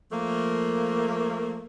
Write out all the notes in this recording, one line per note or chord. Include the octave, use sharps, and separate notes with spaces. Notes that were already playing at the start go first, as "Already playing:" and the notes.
F3 A3 A#3